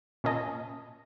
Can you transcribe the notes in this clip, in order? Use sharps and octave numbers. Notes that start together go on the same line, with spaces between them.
A#2 C#4 A#4 D#5 G#5 A5